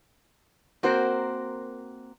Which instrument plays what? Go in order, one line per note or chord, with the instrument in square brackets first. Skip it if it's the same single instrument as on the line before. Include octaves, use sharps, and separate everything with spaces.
[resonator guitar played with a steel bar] A#3 C4 F#4 A#4 C5